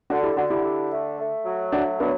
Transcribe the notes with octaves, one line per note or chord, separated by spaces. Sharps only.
D3 D4 F#4
E4 G4
D3 D4 F#4
E4 G4
D3
A3
A3
F#3
A3 D4 F#4
F#3 B3 D4